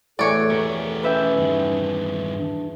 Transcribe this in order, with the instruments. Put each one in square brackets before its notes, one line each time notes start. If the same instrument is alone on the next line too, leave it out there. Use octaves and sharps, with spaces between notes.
[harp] E2 A2 [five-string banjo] F#4 C#5 D5 [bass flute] A4
[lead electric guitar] A3 G4 [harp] A#4
[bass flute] C#4 [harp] B4 E5 G5
[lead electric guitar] G2 D#3
[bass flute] D4